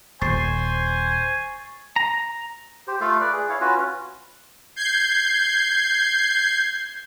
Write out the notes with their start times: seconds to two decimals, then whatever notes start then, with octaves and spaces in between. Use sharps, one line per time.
0.22 D#1 C5 G#5 C#6 A6 C7
1.96 A#5
2.87 G4 C5
3.01 A3 F4 A4 F5
3.20 B4 D5
3.32 G#4
3.49 E4 C#5 F5
3.61 C#4 F4 F#4 B4
4.76 G6 G#6 C7